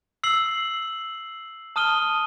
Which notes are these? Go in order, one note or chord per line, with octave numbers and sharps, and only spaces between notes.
E6 C7 F#7
A5 D#6 F6 D#7 G7